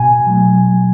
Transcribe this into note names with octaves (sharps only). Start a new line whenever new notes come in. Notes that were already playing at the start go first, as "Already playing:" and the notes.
Already playing: B2 G#5
F#3 A3